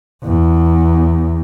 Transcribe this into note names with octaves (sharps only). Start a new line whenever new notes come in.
E2